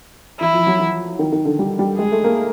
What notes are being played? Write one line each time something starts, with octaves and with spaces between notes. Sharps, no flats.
E3 E4
F3
F#3
E3
D#3
D#3
D3
G3
G3
G#3 G#4
A3
A#3